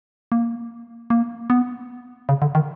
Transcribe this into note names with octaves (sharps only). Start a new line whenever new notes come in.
A#3
A#3
B3
C#3
D3
D#3